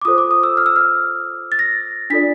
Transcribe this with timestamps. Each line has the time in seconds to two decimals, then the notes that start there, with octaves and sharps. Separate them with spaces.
0.01 D6
0.05 F4 A4 C5 D#6
0.18 D6
0.31 D#6
0.43 E6
0.57 F6
0.66 E6
0.76 F6
1.52 A6
1.59 A#6
2.10 D4 F4 A4 D5 B6